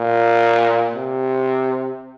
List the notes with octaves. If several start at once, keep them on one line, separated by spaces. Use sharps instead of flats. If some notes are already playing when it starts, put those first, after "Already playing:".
Already playing: A#2
C3